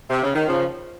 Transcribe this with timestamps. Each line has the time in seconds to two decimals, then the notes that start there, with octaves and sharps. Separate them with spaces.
0.10 C3
0.23 C#3
0.35 D#3
0.48 C#3 F3